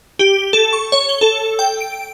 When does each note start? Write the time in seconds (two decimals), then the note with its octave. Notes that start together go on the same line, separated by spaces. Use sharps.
0.19 G4
0.53 A4
0.73 C#6
0.92 C#5
1.09 G7
1.21 A4
1.59 G5
1.81 D7